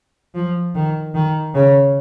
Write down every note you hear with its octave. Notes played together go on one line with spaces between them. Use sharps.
F3
D#3
D#3
C#3